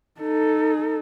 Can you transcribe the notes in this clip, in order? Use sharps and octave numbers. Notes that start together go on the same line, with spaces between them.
D#4 A4